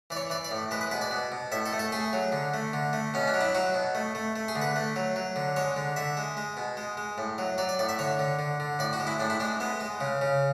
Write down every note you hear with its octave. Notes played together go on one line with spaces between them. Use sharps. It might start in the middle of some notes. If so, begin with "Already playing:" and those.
E3 D5
C#5
E3 D5
D5
A2
G#3 B4
B4
B2 B4
D5
B2
B2
A2 E5
A4
A3
A4
A3 G#4
F#3
D3
A3
D3
A3
B2 C#4
D4
F#3
E4
F#3 F#4
B2
A3
A3
A3
G#4
D3
B4
A3
F#3
F#3
D3
G#3 C#5
D3
D3 E5
G#3
G#3
B2
G#3
G#3
A2
F#3
F#3 D5
D5
A2 D5
E5
D3 C#5
D3
D3
D3
A2 D5
F#4
G#3
E4
A2 D4
E4
G#3 D4
G#3 B3
G#3
C#3
C#3